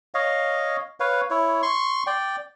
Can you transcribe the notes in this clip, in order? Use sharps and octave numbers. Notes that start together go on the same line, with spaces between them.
C#5 D#5 F5
B4 C#5 F5
E4 C#5
C6 C#6
D5 G5